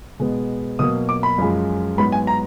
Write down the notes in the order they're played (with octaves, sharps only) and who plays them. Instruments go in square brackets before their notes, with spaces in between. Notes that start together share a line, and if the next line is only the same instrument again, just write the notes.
[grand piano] B2 G#3 B3
B2 F#3 A#3 D#6
D6
B5
F#2 F3 G#3
G#2 F#3 B3 B5
G#5
A#5